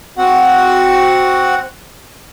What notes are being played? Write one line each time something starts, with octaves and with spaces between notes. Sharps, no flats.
C4 F#4 F#5